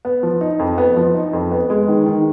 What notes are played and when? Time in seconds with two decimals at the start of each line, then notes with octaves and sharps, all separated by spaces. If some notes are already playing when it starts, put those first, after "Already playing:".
0.05 B3
0.23 F3
0.41 D#4
0.59 F2
0.78 B3
0.97 F3
1.14 D#4
1.33 F2
1.52 B3
1.70 G#3
1.88 D#3
2.06 D#3